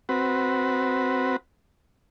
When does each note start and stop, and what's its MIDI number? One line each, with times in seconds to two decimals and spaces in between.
0.09 1.36 60
0.09 1.36 66
0.09 1.36 71